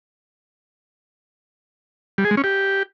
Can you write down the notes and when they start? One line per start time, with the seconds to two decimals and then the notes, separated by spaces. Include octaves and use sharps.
2.18 G3
2.25 G#4
2.31 G#3
2.37 C#4
2.44 G4